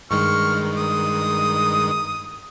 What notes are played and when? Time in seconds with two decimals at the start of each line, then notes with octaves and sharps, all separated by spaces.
0.11 G2 D#3 G#3 C#6 F6
0.77 D#6